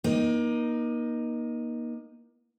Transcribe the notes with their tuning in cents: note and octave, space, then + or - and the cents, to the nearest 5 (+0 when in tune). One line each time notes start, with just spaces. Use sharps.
A#3 +35 D#4 +0